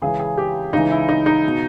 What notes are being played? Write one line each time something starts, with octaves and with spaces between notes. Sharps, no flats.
C#2 C#3 E3 G#4
G#4
G4
C#2 C#3 E3 D#4
E4
D#4
D#4
B2